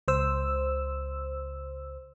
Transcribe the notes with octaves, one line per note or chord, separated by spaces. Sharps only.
C#2 C5 E6